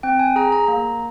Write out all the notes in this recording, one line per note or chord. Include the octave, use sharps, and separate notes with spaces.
C4 G5
G#5
G#4 A#5
A#5
A#3 A#5